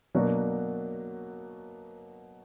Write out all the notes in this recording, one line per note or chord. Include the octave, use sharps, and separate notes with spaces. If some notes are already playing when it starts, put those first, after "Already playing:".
B2 F#3 A#3 D4 F#4